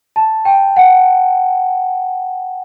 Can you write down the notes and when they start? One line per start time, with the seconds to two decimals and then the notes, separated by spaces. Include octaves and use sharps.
0.16 A5
0.45 G5
0.77 F#5